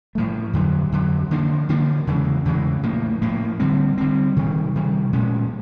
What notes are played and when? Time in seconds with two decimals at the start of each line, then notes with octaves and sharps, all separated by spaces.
0.15 A2 F3 A3
0.53 F2 D3 F#3
0.92 F2 D3 F#3
1.31 D3 F3 A#3 D4
1.69 D3 F3 A#3 D4
2.07 E2 C#3 E3 G#3
2.45 E2 C#3 E3 G#3
2.83 A2 F3 A#3
3.22 A2 F3 A#3
3.60 D3 G3 C4
3.98 D3 G3 C4
4.36 C3 D#3 G3
4.75 C3 D#3 G3
5.13 A#2 F3 G#3 C#4